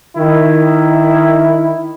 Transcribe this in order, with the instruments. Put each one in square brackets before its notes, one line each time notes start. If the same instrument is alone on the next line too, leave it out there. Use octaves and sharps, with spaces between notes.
[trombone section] D#3 E4